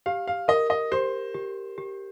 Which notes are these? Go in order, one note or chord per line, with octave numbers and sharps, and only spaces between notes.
G4 F5
F5
A#4 D#5
D#5
G4 C5
G4
G4